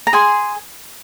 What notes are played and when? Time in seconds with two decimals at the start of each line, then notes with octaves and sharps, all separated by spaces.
0.07 A#5
0.13 G#4 G#5 C6